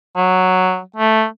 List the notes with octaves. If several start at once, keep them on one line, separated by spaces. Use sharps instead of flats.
F#3
A3